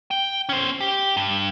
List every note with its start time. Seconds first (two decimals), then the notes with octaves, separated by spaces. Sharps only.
0.11 G5
0.49 C#4 C5
0.81 G4
1.17 G2